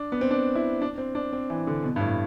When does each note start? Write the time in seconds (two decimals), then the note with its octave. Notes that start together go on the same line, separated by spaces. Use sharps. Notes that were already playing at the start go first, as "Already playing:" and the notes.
Already playing: D4
0.12 B3
0.21 C4
0.31 D4
0.55 E4
0.82 D4
0.98 C4
1.15 D4
1.33 C4
1.50 E3
1.67 D3
1.84 B2
1.96 G2
2.00 A2